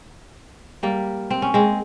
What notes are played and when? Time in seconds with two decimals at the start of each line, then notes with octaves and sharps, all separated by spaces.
0.83 G3 A#3
1.31 C4
1.42 C#4
1.54 G#3 C4